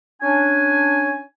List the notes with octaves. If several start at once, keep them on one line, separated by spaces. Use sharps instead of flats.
C#4 D4 G#5